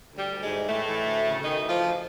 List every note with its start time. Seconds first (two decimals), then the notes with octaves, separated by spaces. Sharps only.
0.12 D2
0.18 G3
0.31 D2
0.43 G#2 G#3
0.49 E3
0.68 A2 E3 A3
0.87 E3
1.06 D2
1.25 C#3
1.43 D2 D#3 D#4
1.62 E3
1.69 F3 F4
1.81 D2